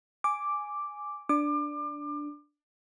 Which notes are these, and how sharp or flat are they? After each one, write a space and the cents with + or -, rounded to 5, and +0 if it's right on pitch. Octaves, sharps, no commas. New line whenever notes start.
G#5 +0 D6 +0
D4 +0 D6 +30